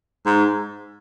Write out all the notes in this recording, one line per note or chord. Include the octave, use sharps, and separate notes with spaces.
G#2